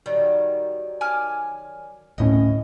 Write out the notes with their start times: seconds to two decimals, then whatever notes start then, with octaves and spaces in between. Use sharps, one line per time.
0.06 D#3 F#3 G3
1.01 G#5 D6 F6
2.18 D1 A2 C#4 D#5